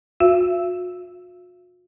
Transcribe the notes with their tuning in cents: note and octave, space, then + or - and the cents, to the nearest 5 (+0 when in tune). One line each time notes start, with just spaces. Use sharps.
F#4 -45 E5 +45